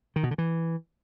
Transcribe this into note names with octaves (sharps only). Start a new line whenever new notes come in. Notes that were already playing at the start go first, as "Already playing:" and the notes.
D#3
B2
D3
E3